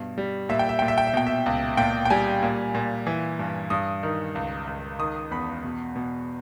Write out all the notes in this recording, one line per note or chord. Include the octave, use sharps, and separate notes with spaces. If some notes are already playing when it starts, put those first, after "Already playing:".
Already playing: G2 B2
G3
A#2 E5
G5
E5
A#2 G5
E5
G5
E5
B2 G5
E5
C#2
A#2 G5
G5
G3 G#5
A#2
A#2
E3
G2
G2 D#6
D#3
C#2
C#2
D#3 D#6
E2 B5
B2
B2